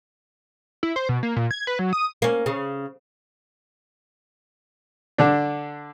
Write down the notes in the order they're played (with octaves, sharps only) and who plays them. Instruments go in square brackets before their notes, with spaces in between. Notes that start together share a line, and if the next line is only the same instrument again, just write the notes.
[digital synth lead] E4
C5
B2
A#3
A#2
G#6
B4
F#3
D#6
[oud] A#3 C#4
C#3
[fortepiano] D3 D4